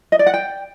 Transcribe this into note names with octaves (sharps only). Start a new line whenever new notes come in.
D#5
D5
F#5
G5